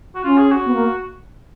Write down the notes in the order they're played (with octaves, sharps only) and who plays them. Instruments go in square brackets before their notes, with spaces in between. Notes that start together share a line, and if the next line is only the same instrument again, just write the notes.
[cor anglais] F#4
[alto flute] C#4 [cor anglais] F4
[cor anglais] G#4
F#4
[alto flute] B3
A#3